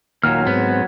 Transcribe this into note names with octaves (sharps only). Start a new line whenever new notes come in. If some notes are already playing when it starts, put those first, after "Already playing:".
D#2 A#2 F#3 A#3 F5 F6
G#2 B3 C4